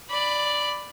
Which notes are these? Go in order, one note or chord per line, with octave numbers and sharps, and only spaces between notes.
D5 B5